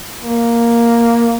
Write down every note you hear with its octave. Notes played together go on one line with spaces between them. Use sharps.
A#3